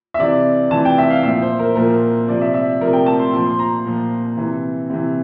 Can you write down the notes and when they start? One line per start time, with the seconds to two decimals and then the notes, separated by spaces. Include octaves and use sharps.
0.14 E5
0.19 C3 E3 D5
0.71 C3 E3 A5
0.85 G5
0.98 E5
1.10 F5
1.23 A#2 F3 E5
1.42 C5
1.59 A#4
1.75 A#2 F3 A#4
2.28 C3 F3 D5
2.41 E5
2.54 E5
2.81 C3 F3 A#4
2.93 G5
3.06 A5
3.20 C6
3.33 A#2 F3 C6
3.47 C6
3.59 A#5
3.86 A#2 F3
4.37 C3 E3
4.90 C3 E3